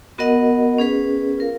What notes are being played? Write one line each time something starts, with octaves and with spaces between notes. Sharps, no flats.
B3 F#4 A#4 D#5 F#5
C#4 G#4 B4
F4 A#4 F5